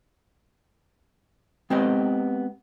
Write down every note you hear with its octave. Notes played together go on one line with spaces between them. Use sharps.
G#3 B3 C4 G4 B4 D#5